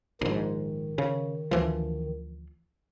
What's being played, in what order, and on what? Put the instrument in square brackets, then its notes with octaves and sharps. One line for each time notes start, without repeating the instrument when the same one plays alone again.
[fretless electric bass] A#1 G#2 [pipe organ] D#3
[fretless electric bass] C#3
D2 E3 F3